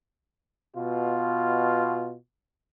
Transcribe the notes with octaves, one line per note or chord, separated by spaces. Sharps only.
B2 F4